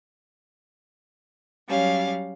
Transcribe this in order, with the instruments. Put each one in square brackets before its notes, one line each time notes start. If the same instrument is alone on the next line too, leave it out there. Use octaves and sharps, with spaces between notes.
[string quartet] F#3 G3 C#4 F5